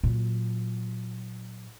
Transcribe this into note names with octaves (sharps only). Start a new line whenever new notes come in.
A#2 F#3